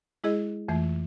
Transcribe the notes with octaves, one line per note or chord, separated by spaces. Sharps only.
G#3 E4 G#4 D#5
F2 E3 A3